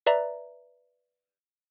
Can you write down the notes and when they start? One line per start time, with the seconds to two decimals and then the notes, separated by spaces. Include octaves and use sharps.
0.06 B4 D5 E5 A#5